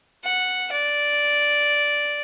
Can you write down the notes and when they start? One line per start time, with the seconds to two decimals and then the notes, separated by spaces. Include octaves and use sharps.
0.24 F#5
0.72 D5